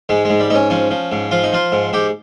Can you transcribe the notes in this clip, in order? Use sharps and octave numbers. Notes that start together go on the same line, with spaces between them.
G#2 G#3
G#2 G#3
G3
G#2 C#4 D#4
F3 C#4
F3
G#2
F3 F4
D#4
F3 F4
G#2
G#2 G4